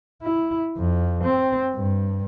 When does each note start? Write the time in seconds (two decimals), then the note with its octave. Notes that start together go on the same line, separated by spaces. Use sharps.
0.23 E4
0.77 F2
1.24 C4
1.74 G2